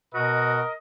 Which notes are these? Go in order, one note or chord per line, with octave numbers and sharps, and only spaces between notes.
B2 F#4 A#4 D#5